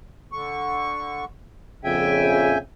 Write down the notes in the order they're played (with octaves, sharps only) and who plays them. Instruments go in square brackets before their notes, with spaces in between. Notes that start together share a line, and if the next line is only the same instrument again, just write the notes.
[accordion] D3 C#6
[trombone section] A#1 F2 C#3 [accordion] E5 G5 G#5